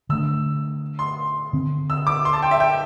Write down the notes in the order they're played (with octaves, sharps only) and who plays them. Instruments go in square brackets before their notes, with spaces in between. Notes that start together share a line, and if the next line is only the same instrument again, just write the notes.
[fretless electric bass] D3 A3 D4 [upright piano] E6
[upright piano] C6
[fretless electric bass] D3 C4
[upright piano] E6
D6
C6
A5
G5
E5
G5